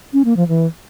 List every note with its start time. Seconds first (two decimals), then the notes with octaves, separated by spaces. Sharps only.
0.13 C#4
0.25 A#3
0.36 F3
0.48 E3